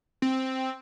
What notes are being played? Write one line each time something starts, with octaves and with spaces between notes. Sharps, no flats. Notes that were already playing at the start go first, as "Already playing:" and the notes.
C4